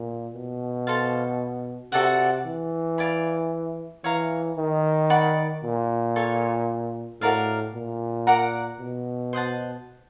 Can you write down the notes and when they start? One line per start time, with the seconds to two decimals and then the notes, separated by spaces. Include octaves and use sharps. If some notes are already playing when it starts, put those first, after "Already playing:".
Already playing: A#2
0.34 B2
0.87 A4 C5 F5 A5
1.92 C3 F#4 A4 D5 F#5
2.45 E3
2.98 D5 F5 G#5 B5
4.04 E3 C#5 F5 A#5
4.57 D#3
5.10 D5 F#5 B5
5.63 A#2
6.16 A4 C#5 F5 G#5
7.21 A2 F#4 A#4 D5 F5
7.74 A#2
8.27 A#4 D5 F#5 A#5
8.80 B2
9.33 C5 D#5 F#5 A5